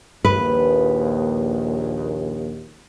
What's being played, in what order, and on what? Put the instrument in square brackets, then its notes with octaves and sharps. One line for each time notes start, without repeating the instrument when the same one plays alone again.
[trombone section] A#1 D#2 [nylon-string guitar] B4